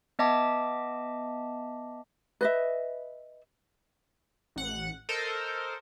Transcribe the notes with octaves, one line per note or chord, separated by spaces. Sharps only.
B3 D#5 E5 A5 D6
B4 D#5 E5
A1 F#5
A4 A#4 C5 D#5